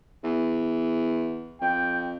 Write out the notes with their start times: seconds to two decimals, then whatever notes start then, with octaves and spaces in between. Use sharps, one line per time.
0.24 E2
1.61 F2 G5